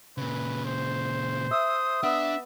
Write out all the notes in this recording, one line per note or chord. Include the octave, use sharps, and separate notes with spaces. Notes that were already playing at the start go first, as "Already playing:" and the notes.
A#2 C#3 B4
C5
E5 D#6
B3 D4 E5